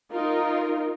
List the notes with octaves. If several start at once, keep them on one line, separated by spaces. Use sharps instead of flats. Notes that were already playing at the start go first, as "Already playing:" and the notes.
D#4 F4 A#4